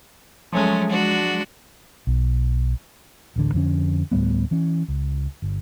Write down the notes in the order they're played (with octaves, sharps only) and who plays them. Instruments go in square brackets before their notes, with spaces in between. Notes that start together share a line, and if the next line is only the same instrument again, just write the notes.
[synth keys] F3 F#3 G#3 [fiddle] A3 C#4
[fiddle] D4 F#4
[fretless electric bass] B1
[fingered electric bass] D1 A1 D3
F2 D3 C#4
D2 A2 G3 B3
E3 C#4
C#2
G1